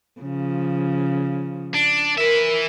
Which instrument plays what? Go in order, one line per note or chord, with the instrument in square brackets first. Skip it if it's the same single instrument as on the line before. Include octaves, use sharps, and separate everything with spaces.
[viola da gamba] C#3 F3
[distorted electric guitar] D4
[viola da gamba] A#4 [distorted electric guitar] B4 E5